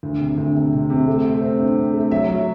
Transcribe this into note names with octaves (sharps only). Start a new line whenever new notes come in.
D2
C3
D2
C3
C3
C3
A3
A3
C4
G2
C4
A3
F#3 E5
F#3